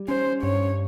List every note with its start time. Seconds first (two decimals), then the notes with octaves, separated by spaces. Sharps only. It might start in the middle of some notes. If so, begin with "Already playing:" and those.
Already playing: G3
0.08 C#4 C5
0.43 G2 C#5